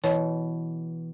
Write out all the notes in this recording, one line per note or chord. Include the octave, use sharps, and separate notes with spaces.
B2 E3 C#5